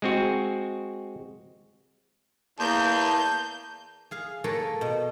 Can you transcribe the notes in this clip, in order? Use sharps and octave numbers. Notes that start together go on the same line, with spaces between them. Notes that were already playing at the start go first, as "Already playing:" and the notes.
G#3 C4 F#4
E2 A#3 A5 G6
G#4 F5
A#3 A4 B4 C#5
B2